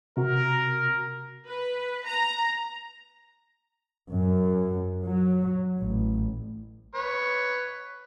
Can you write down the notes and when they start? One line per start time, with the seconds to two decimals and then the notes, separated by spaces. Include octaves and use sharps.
0.17 C3 F#4 A#4
1.47 B4
2.06 A#5
4.11 F#2
5.03 F#3
5.80 A1
6.95 B4 C#5